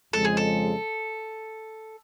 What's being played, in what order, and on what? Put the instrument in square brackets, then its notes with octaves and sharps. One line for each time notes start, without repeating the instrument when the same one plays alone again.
[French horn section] F2 C#3 F3 G#3 [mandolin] A4
[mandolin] G#4
A4